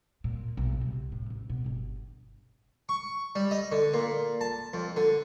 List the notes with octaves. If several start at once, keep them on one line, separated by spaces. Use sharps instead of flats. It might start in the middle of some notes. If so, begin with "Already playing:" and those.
A#2
B1
C2
A2
A1
B2
G1
C#6
G3
D#5
D3
A#2
A5
F2
D3